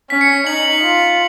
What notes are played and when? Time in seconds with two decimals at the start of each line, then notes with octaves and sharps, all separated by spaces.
0.10 C#4 B6
0.21 C#7
0.47 D#4 F#7
0.83 F4